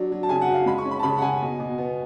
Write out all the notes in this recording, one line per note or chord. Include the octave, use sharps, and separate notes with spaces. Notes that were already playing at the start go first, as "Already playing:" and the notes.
Already playing: F#3 D4
F#3
A5
C#3 G#5
F#5
F#3
F5
G#3 B5
C#6
C#4
B5
A5
C#3 B5
F#5
C#3 G#5
B2
B2
B3